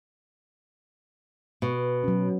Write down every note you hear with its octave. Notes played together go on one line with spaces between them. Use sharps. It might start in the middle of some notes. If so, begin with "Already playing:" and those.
B2
F#3 C#4